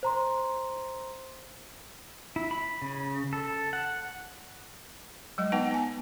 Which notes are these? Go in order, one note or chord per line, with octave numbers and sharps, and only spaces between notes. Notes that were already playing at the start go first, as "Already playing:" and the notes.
C5 A#5 C6
E4
B5
C#3
A4
F#5
F#3 G#3 D#5
B3 D#4 B4 F#5 G5
B3 G#5